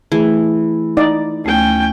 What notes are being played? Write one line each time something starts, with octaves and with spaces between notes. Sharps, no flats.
E3 A3 G#4
D#4 D5
D2 A3 C#4 G5